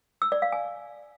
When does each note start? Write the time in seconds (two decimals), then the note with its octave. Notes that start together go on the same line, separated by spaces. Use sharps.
0.22 E6
0.32 D5
0.42 F5
0.52 G#5